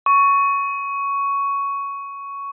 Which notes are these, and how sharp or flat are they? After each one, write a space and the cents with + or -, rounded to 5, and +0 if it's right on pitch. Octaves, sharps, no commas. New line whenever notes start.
C#6 +10